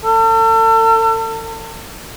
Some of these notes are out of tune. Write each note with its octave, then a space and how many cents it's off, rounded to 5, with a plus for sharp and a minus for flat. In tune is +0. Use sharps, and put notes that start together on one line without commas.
A4 +40